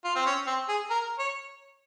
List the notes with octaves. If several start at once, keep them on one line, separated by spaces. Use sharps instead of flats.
F4
C4
C#4
C4
G#4
A#4
C#5